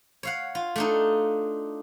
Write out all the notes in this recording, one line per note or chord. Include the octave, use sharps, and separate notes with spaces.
C#5 F5 F#5
F4
A3 D4 D#4